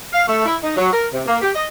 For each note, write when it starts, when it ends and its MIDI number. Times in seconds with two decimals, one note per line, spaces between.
0.12 0.26 77
0.27 0.43 57
0.46 0.56 64
0.62 0.74 63
0.76 0.90 54
0.92 1.06 70
1.12 1.21 48
1.26 1.36 58
1.41 1.50 67
1.55 1.66 75